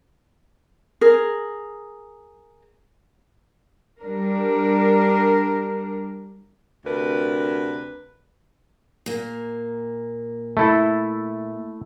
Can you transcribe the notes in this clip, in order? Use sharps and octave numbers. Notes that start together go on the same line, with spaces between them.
G#4 A#4
G3 D4 A#4
D2 C3 D4 A#4 B4
A#2 A#3
A3 E4 A4